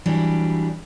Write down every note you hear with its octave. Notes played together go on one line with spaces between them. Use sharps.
E3 F#3 G3 D4 E4